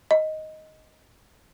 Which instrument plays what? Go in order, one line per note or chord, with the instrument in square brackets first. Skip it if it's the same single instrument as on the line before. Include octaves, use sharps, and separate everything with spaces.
[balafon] D#5